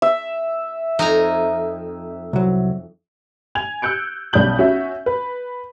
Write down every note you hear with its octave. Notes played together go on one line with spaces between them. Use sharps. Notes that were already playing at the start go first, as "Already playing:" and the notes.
E5
F2 D#4 G#5 A#5
C2 F#3
G#5 G#6 F7
E6 F#6 G6 C#7 D7
B1 G3 C#4 D#6 G6 F#7
C#4 F#4 E5
B4